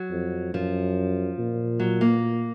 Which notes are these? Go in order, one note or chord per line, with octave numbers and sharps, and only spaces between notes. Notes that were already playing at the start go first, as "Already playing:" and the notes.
Already playing: F#3
F2
F#2 F3
A#2
F#3
A#3